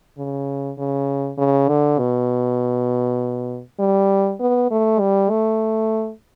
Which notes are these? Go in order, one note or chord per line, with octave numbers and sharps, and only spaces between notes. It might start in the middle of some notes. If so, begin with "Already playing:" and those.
C#3
C#3
C#3
D3
B2
G3
B3
A3
G3
A3